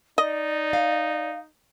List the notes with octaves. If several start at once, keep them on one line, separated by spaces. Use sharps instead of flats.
D#4 D5 D#5
F5